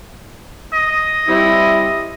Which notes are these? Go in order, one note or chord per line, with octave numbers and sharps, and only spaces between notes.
D#5
G3 C4 E4